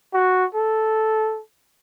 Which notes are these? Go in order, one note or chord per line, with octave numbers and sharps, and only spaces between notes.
F#4
A4